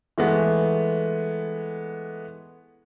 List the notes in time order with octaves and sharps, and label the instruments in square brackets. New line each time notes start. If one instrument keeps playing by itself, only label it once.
[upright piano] E3 G#3 A3 B3